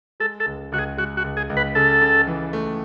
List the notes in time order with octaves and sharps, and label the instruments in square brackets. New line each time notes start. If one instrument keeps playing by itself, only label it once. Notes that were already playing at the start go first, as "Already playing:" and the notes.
[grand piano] G#3 [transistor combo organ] A4
[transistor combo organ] A4
[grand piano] C#2
[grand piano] C#2 [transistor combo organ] F#4
[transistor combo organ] G#4
[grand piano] G#3 [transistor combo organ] F#4
[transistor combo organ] F#4
[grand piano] C#2
[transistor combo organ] G#4
[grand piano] C#2
[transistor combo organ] B4
[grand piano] C#3 [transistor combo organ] A4
[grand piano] C#3
E3
A3